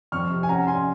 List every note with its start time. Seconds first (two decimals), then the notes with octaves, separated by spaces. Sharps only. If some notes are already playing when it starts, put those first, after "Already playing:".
0.12 F2 C#6 F6
0.30 C3
0.43 G#5
0.49 C#4 F#5 A#5
0.67 C#4 G#5 C6